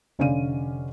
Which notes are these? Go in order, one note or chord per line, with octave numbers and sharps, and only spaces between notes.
F1 D3 C#4 D5 F5 D#7